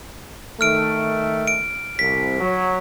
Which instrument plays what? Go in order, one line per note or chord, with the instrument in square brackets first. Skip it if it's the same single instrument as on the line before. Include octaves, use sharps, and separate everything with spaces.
[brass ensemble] D#3 A3 [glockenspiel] F6 D7
[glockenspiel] D7
[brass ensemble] C2 [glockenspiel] B6
[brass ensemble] F#3